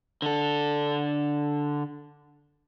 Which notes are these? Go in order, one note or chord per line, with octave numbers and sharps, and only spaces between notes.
D3 A4